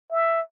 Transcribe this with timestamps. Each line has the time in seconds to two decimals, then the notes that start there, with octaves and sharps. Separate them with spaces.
0.11 E5